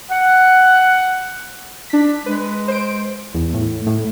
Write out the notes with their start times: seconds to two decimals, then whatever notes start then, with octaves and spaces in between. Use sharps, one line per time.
0.11 F#5
1.90 D4 B6
2.26 G#3 B4
2.68 C5 D7
3.35 E2
3.54 A2
3.87 A2